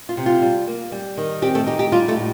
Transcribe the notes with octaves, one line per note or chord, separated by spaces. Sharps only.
F4
C3
F4
G3
A#3
G3
D#3
C4 G4
A3 A4
D#4 G4
G4
G3 F4
A3 A4
A2